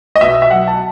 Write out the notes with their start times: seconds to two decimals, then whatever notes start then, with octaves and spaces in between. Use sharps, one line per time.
0.16 D#5
0.21 B2 E5
0.42 E5
0.50 F#3 F#5
0.67 A5